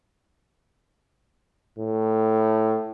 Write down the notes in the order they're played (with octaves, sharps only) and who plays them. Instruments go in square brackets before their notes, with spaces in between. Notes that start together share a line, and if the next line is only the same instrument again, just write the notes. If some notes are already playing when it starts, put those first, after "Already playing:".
[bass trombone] A2